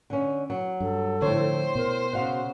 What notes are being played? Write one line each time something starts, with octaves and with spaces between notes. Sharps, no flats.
D3 C#4
F#3
G2 A4
A2 D3 F3 C5 C#5
B2 A#4
C#3 F#4 F5 F#5